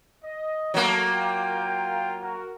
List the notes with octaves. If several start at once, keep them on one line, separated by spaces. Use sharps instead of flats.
D#5
F#3 A3 A#3 A4
F4 F5 G5
F#4 A#4